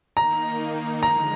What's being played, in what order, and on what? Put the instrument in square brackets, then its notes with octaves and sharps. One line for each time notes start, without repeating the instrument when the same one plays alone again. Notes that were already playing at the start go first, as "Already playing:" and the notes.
[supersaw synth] D#3 A#3 D#4 [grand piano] A#5
[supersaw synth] D3 F3 G#3 [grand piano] A#5